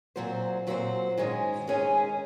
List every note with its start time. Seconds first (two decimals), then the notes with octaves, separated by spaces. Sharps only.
0.16 A#2 F#3 C4 F#4 C5
0.67 A#2 F#3 C4 F#4 C5
1.18 G#2 D#3 G#3 C#4 G#4
1.67 G#2 D#3 G#3 C#4 G#4